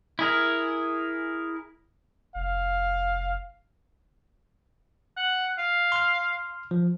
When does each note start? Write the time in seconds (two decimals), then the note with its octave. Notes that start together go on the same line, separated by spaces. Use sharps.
0.19 E4 G#4 A#4
2.35 F1 F5
5.17 F#5
5.58 F5
5.92 C6 F6
6.71 F3